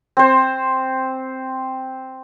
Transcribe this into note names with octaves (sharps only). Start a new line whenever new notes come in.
C4 C5